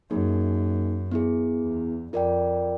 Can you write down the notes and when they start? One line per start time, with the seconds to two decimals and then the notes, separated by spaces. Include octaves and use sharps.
0.10 F#2 A#3 D#4 G#4
1.12 B3 E4 G#4
1.62 E2
2.12 F2 F4 A#4 D5 G5